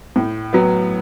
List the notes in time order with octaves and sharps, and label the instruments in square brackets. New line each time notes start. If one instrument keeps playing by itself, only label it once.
[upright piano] A2
F#3 B3